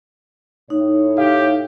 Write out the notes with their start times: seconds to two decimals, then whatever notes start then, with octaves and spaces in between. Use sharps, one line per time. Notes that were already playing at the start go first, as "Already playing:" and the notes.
0.70 A2 D#4 C#5
1.18 G4 F5